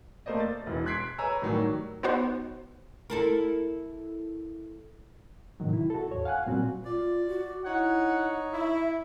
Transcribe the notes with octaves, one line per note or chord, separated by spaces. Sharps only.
A3 A#3 C5 D5 D#5
A6
E1 E3
C6 F#6 G#6 B6 C7 D7
B4 C#5 G#5 A#5 E6
A2 D#3 F#3 G3
B3 D#4 F#4 C5
E4 A4 A#4
A2 C3 D#3 F#3
E4
F#4 A4
D#2 G#2 C#5
F5 F#5 G#5 F#6
A#2 F#3 G3 C4 F#4
F4 D5
F#4
D#4 E4 C#5 F#5
E4 E5